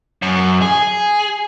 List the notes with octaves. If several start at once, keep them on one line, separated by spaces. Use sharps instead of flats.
F#2
G#4
G#4